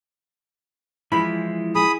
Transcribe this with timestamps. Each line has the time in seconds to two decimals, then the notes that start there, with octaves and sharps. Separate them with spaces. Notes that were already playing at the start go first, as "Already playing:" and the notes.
1.12 E3 F3 G#3 E4 B5
1.75 G#4 B5 D#6